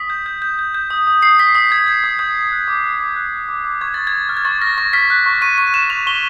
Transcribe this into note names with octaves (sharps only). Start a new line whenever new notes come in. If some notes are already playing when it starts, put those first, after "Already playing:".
Already playing: D#6 B6
G6
G6
G6
G6
G6
D#6
D#6
D#6 C7
D#6 B6
D#6 B6
D#6 G#6
G6 G#6
D#6
D#6 G6
D#6
F#6
D6
F#6
D6
F#6
D6
D6
D6
C#6 G#6
F6 A6
G#6
C#6
F6
G#6
C#6 A6
F6 A#6
C#6 A#6
F6 B6
F#6
C#6
C#6 D#7
C#6 D#7
F#6 E7
C#6 F7
C#6 G7